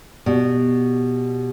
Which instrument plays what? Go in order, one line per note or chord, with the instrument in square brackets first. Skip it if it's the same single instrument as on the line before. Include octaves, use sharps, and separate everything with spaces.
[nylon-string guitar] B2 [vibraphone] G4 D5